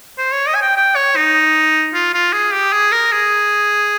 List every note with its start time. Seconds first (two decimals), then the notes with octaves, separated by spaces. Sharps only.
0.18 C5
0.32 C#5
0.48 D#5
0.55 G#5
0.62 G5
0.77 G5
0.96 C#5
1.16 D#4
1.94 F4
2.14 F4
2.33 G#4
2.53 G4
2.73 G#4
2.92 A#4
3.12 G#4